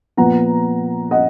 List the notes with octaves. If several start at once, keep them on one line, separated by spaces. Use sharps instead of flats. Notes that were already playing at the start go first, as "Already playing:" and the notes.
A#2 F3 B3 F#5 A#5
D#5 F#5